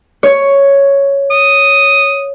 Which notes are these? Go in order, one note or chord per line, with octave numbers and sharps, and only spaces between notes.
C#5
D#6